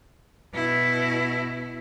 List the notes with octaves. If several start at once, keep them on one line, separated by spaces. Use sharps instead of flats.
B2 E4